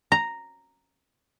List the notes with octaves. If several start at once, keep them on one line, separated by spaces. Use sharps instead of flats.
A#5